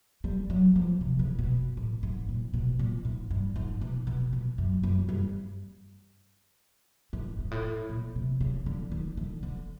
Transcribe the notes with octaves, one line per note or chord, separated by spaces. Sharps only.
G3
F#3
F3
C3
C#3
B2
A2
G#2
A#2
B2
A#2
G#2
G2
G#2
B2
B2
B2
F#2
F#2
G2
G#2
G#2
A2
A#2
C3
C#3
D3
D#3
D3
D3